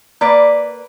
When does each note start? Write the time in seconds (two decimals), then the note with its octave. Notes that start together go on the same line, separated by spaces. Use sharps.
0.21 A#3 B4 D5